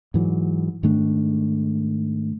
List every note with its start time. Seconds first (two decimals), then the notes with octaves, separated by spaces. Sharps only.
0.14 G#2 E3 F#3
0.83 G#2 D#3 A3 D4